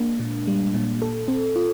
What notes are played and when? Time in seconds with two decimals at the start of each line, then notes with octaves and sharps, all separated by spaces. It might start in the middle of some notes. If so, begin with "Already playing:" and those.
Already playing: G#3 A#3 D4
0.19 A#2
0.47 G3
0.74 A#2
1.02 A4
1.28 C4
1.56 F4